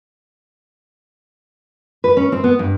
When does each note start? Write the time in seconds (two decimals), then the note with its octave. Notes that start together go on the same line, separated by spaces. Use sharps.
2.04 B4
2.17 C#4
2.32 C4
2.44 B3
2.59 G2